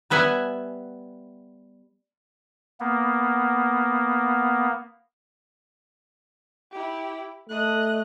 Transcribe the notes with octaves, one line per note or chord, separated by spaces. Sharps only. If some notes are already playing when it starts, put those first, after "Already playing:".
G3 B3 E5 F#5 G#5
A#3 B3
E4 G4
A3 D#5 F#6